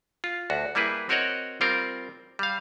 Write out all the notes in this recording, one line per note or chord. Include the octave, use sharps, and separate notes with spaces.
F4
D2 F#4
G3 A#3 E4 G#4 B4
C4 F#4 A#4 C#5 D#5 F#5
G3 C4 F4 A#4
G3 F5